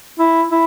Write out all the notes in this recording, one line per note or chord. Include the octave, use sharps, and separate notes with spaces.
E4
E4